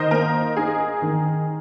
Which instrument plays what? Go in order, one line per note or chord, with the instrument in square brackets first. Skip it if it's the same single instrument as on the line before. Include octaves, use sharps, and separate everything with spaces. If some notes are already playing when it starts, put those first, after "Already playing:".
Already playing: [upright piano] D#3 [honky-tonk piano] A#4 C5 D#5
[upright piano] A#3 [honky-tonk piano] A#4
[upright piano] D#4 [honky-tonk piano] G#4
[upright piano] D#3